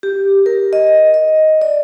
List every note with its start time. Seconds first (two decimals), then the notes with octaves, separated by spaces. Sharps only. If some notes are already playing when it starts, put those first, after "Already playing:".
0.03 G4
0.46 A#4
0.73 D#5
1.14 D#5
1.62 D5